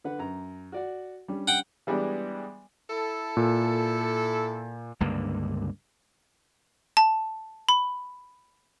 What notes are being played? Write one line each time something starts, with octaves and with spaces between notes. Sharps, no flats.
D3 B4 F#5
F#2 A#5
F#4 D5 F#5
G3 C#4 D4
F#5 G5
E3 G3 G#3 B3 D4
E4 A4
A#2
C#2 G2 D3 A#3
A5
B5